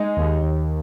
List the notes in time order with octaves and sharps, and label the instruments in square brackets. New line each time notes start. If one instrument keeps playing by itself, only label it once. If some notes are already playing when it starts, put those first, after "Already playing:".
Already playing: [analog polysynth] G#3 [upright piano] D#4
[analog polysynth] D#2
D#2